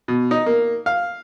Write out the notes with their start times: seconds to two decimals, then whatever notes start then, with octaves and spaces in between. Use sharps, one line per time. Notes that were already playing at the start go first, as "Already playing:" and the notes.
0.08 B2
0.31 D#4
0.46 A#3
0.86 F5